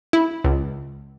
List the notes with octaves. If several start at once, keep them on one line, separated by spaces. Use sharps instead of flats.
E4
C#2